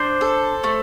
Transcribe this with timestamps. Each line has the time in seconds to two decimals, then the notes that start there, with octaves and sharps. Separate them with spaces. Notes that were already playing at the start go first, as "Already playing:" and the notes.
Already playing: D4 C5
0.21 A4
0.64 A3